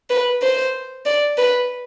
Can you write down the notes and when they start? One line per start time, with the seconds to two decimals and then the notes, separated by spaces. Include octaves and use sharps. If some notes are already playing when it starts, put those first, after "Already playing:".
0.10 B4
0.42 C5
1.05 D5
1.37 B4